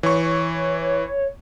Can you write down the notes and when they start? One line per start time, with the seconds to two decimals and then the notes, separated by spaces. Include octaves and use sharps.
0.03 E3 C#5 C#6